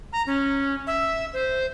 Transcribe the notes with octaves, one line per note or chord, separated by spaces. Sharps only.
A#5
C#4
E5
C5